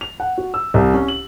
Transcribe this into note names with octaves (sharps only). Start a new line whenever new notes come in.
F7
F#5
F#4
E6
C2
C#4
F#7